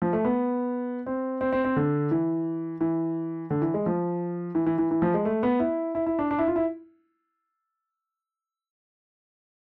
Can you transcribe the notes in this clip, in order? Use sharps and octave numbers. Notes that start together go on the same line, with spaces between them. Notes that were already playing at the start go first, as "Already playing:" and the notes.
F3
A3
B3
C4
C4
C4
C4
D3
E3
E3
D3
E3
G#3
F3
E3
E3
E3
E3
F3
G#3
A3
B3
E4
E4
E4
D4
D4
E4
F4
E4